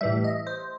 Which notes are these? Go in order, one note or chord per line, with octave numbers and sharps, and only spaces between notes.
A2 E3 G3 E5
D#5
C5